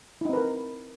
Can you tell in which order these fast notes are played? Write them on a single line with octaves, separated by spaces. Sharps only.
E4 D#4 C4 B4 A#4